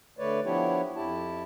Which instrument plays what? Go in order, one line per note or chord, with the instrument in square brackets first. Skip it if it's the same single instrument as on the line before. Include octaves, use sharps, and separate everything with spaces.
[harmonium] D3 A3 B4 C#5 D5
F3 B3 D4 E4 G4 C#5
F2 E4 G4 A5